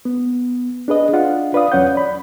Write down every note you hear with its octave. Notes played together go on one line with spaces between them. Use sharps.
B3
D4 G#4 B4 D#5
D4 F4 F#5
B4 D5 F5 D#6
E2 F#3 C#4 C#5 F#5 G6
D5 B5